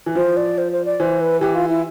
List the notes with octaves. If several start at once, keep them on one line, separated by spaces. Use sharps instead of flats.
E3
F3 C5
D5
C5
C5
D5
E3 C5
B4
E3 G4
F4
E4